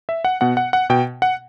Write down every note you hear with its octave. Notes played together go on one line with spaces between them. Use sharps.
E5
F#5
B2 F#5
F#5
F#5
B2 G5
F#5